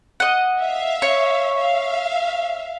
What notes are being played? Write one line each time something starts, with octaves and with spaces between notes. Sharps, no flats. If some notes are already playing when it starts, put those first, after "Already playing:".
D#5 F#5
E5 F5
C#5
E5 F5